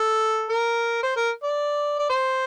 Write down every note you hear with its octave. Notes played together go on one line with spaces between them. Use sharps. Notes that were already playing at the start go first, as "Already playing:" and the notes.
Already playing: A4
A#4
C5
A#4
D5
D5
C5